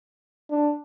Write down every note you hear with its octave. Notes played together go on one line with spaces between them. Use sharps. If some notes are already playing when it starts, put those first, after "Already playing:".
D4